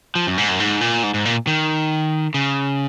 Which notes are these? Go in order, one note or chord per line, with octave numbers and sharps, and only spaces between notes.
F3
F#2
G#2
F#2
G#2
A#2
G#2
G#2
A#2
D#3
C#3